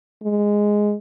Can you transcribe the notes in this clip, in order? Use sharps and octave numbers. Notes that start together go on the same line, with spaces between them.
G#3